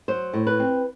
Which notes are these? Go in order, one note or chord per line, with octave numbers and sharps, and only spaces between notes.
F#3 C5
A2
B4
C4